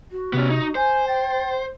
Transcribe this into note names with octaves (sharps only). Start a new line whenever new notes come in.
F#4
C3 B3 C#4
D#4
C5 G#5 G6
G5 A6